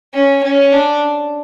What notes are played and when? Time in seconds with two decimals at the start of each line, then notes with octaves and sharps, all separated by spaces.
0.14 C#4
0.43 C#4
0.72 D4